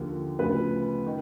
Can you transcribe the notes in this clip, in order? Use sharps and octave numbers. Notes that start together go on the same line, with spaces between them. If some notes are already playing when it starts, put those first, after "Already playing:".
Already playing: D#2 D3 F3 A#3
D2 C#3 F3 B3 B4
D#3